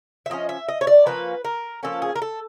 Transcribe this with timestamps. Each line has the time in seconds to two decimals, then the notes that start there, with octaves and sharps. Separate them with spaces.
0.26 E5
0.30 F3 A#3 C#4 D#5
0.49 E5
0.69 D#5
0.81 C#5
0.87 D5
1.06 F3 A#3 C#4 B4
1.45 A#4
1.83 F3 A#3 C#4 A4
2.02 G#4
2.16 A#4
2.22 A4